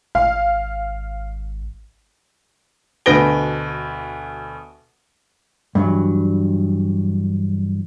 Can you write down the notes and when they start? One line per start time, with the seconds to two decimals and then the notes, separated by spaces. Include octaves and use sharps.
0.15 G#1 F5
3.06 D2 B2 B4 A#6 D7 G7
5.75 G2 E3 F#3